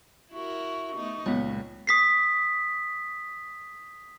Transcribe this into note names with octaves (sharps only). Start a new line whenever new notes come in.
E4 F#4 A#4 C#6
A3 B3 D#4
C#2 A#2 F#3 B3 C#5
D#6 B6 C7